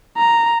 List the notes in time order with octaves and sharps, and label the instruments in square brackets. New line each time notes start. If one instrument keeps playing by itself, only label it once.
[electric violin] A#5